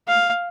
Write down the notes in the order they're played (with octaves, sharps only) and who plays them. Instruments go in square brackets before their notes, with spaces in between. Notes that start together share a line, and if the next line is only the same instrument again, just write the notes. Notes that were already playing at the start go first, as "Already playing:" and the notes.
[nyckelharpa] F5